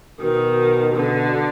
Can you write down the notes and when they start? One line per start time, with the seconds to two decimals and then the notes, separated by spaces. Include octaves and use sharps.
0.21 B2 D#3
0.94 B2 D3